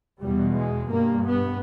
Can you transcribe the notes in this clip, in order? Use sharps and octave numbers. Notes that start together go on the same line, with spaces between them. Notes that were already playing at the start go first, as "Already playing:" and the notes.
E2 B2 G3
G#3
G2 A#3
B3